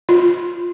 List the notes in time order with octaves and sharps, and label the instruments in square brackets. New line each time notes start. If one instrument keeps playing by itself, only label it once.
[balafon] F4